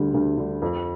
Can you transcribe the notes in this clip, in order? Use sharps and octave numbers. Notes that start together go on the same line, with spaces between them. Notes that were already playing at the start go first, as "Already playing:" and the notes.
Already playing: D2 D3 G3
D2
D3 G3
F2